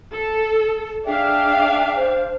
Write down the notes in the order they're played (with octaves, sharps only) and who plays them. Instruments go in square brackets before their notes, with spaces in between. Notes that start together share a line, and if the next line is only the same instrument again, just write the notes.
[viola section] A4
[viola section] D4 F5 [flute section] G#4 E5 G5
[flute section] C5